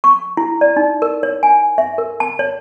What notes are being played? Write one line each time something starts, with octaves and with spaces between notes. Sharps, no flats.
C#6
E4
D5
D#4
A#4
C#5
G#5
E5
A#4
A5
C#5